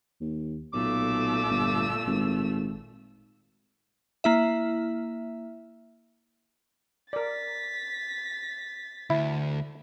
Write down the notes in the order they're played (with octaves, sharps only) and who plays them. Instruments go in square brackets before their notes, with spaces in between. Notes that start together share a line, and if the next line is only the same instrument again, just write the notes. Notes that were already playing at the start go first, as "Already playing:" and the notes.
[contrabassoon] D#2
[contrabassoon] B1 [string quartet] A#2 A3 E6 [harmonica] D6
[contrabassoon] G1
G#1
[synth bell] A#3 E4 E5
[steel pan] A#4 D5 [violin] A6 B6
[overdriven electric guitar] D2 [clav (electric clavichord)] E4